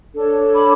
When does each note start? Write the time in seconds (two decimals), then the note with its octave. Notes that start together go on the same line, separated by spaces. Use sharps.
0.13 D4 A4 C#5
0.53 B5 D6